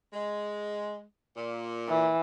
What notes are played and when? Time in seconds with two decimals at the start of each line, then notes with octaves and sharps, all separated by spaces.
0.13 G#3
1.36 A#2
1.89 E3